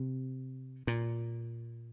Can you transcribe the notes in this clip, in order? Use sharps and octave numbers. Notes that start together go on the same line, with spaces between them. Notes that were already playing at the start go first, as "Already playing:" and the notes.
Already playing: C3
A#2